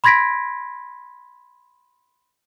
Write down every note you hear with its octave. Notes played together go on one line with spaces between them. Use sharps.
B5 C6 G#6 A#6 B6 D7